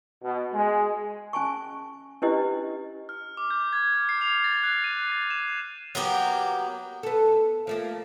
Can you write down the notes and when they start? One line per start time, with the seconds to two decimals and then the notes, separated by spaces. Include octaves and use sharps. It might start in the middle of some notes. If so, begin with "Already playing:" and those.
0.24 B2
0.54 G#3
1.33 C#4 G#5 A5 C#6
2.22 C#4 D4 E4 G4 B4 D#5
3.09 F6
3.37 D6
3.51 G6
3.73 G#6
3.94 F6
4.09 C7
4.21 F7
4.44 A6
4.63 F#6
4.84 D#7
5.12 A6
5.30 E7
5.95 F#3 A#3 B3 G4
7.03 B3 A4
7.67 F3 A3 A#3